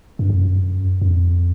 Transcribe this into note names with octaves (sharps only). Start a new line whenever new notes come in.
G2
F#2
F2